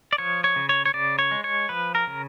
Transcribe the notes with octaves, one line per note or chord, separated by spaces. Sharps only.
D5
F3 C#5
C#5
C#3
C#5
C#5
C#3 D5
C#5
G#3
C#5
F3 B4
A#4
C#3